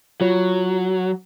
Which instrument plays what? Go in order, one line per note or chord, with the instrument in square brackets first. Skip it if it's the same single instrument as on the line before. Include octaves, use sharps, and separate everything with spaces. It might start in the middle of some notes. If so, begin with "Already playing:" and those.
[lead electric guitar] F#3 [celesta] F4 C#5